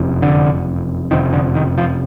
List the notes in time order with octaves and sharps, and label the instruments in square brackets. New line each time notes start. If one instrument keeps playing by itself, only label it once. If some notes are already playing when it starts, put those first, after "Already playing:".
Already playing: [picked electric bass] F#1 F2 C3
D3
F#1 F2 C3 D#3
D3
D#3
F3